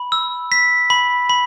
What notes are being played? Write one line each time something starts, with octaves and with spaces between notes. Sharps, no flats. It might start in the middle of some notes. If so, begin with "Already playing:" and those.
Already playing: B5
E6
B6
B5
B5